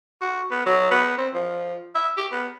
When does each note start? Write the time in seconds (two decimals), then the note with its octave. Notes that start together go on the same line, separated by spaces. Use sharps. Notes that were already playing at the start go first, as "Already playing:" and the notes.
0.21 F#4
0.51 B3
0.66 F#3
0.91 B3
1.18 C4
1.34 F3
1.95 E5
2.17 G4
2.32 B3